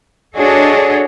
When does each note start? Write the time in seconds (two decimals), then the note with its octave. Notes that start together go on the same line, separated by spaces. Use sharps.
0.36 D4 F#4 G#4 A4 C#5 D#5